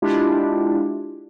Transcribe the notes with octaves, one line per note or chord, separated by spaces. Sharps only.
G#3 D4 E4 F4 G4